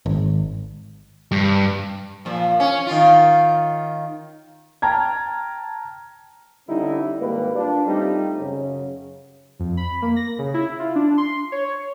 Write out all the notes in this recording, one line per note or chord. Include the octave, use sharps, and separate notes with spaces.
G#1
G2
A#2 F3
C#4
D#3 F4
G5 A5 A#5 F6 G#6
D3 G3 C#4 D#4 E4
G#1 G3 A#3 B4
D4 F4
G3 A3 C4 D#4 F4
F#2 C#3
F2
B5
A#3
A#6
C#3
E4
F4
D4
C6
C#5